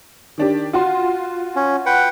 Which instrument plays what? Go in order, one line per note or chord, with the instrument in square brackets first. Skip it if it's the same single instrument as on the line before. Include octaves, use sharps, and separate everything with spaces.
[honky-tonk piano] D#3 D4 G4
F4 F#4 C6
[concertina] C#4
B4 F#5 G5